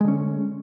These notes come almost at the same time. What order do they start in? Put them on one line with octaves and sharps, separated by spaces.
G#3 D3 C#4